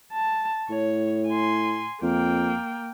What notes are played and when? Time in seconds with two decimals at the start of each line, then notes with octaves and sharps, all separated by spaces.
0.13 A5
0.70 A2 C#5
1.28 G#5 C6
2.02 F2 A#3 G5